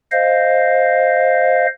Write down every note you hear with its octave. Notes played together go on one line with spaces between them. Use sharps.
C5 D#5 F5